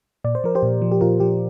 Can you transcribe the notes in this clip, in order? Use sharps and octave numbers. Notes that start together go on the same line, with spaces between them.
A#2 D5
C5
F3 A#4
G4 C5
A#2
F3
G4
A#2 F4 A#4
F3 G4